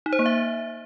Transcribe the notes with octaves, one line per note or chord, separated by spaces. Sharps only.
D#4
C5
A#3
E5